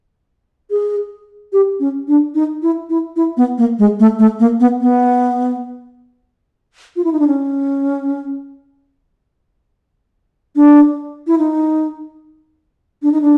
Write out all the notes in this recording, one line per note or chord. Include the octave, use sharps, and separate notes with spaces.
G#4
G4
C#4
D4
D#4
E4
E4
E4
B3
A#3
G#3
A3
A3
A#3
B3
B3
F4
E4
D#4
D4
C#4
D4
E4
D#4
D4
D#4
D4